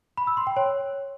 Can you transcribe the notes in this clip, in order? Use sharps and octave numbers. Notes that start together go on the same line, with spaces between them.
B5
E6
C6
G5
C#5